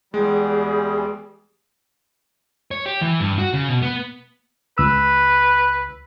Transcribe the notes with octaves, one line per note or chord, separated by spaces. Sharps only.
E2 G3 G#3 G#4
C#5
G4
E3
G2
F#4
C#3
B2
B3
C#2 B4 E6